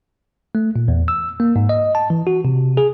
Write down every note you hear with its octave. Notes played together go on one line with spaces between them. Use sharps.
A3
A#2
E2
E6
A#3
G#2
D#5
A5
E3
F#4
C3
G#4